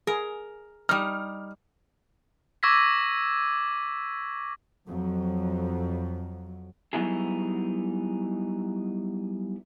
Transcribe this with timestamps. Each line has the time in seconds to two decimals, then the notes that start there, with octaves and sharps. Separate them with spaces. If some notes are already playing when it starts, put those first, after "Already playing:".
0.07 G#4 A#4
0.89 G3 D#4 F6
2.63 C#6 D6 E6 G#6 A#6 B6
4.87 F2 F#3
6.93 F#3 G3 B3 D#4 E4 G#4